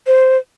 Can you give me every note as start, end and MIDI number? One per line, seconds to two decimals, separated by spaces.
0.07 0.38 72